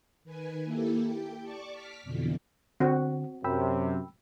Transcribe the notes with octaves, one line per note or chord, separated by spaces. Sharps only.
D#3 B4 G#5
A#3 E4 G4 A4
G4 G5
D5 A5 C#6 D6
D6 F6 B6
F2 B2 D3 E3
D3 C4 F#4
F#2 C3 G5 B5 E6